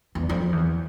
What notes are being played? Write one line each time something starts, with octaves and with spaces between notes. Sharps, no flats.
E2
F2
E2